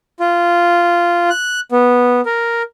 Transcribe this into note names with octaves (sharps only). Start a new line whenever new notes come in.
F4
F#6
B3
A#4